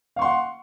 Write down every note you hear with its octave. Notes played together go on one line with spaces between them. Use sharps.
F5 F#5 C6 C#6